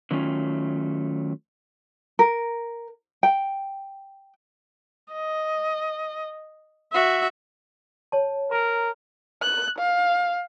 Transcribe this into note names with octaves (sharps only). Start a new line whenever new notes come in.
D3 D#3 F#3 A3 C#4 F4
A#4
G5
D#5
F#4 E5
C#5 A5
A#4 A#5
F#6
F5